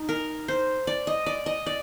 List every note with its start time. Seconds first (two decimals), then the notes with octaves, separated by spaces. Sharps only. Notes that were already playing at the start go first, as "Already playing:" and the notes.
Already playing: D#4
0.09 A#4
0.48 C5
0.87 D5
1.07 D#5
1.26 D5
1.46 D#5
1.66 D5